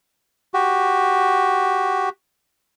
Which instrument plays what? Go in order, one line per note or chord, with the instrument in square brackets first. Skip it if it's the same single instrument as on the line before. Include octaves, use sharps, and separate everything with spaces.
[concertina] F#4 G4